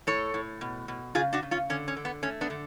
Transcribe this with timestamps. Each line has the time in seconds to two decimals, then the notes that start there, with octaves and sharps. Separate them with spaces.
0.07 A2 A4 C#5
0.34 A2
0.61 B2
0.88 B2
1.15 C#3 F4 G#4
1.33 D4 F#4
1.43 C#3
1.51 C#4 F4
1.70 D3 C#4
1.88 C#4
1.96 D3
2.05 B3
2.23 A3 C#4
2.41 B3 D4
2.50 D3